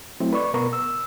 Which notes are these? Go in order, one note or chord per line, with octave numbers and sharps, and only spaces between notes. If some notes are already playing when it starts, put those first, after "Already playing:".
F#3 A3 C4 E4
B4 D5 C#6
B2 B3 A#4 B4 A#5 C#6
E6